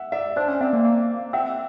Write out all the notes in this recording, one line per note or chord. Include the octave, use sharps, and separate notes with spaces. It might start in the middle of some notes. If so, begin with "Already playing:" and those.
Already playing: E5 F#5
D5 E5
D4 C5 D5
C#4
C4 D5 E5
A#3
A#3
C4 E5 F#5